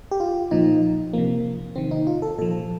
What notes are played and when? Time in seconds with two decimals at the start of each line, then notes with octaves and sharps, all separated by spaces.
0.11 G4
0.20 F4
0.51 A#2 F3 D#4
1.13 C3 F3 A#3
1.76 C3 D#3 C4
1.91 D#4
2.07 F4
2.22 A4
2.38 A#2 F3 A4